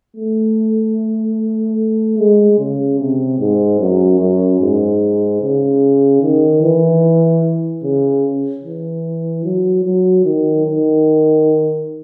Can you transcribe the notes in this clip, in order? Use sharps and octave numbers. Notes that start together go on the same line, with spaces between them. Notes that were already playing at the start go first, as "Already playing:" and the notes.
A3
G#3
C#3
C3
G#2
F#2
F#2
G#2
C#3
D#3
E3
C#3
E3
F#3
F#3
D#3
D#3